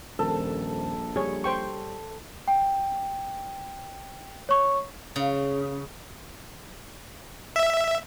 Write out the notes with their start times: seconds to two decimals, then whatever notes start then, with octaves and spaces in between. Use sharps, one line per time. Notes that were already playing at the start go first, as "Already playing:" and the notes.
0.19 D#1 A#1 A4 A#4
1.16 G3 G#4 C#5
1.44 C5 G5 C#6
2.48 G5
4.49 C#5 C#6
5.16 C#3
7.56 E5